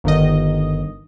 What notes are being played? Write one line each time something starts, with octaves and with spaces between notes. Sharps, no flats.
G1 D#3 D#5